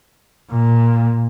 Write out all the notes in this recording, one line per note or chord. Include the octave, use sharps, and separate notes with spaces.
A#2